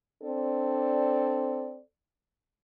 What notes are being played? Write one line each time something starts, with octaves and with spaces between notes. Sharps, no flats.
C4 D4 A4 D5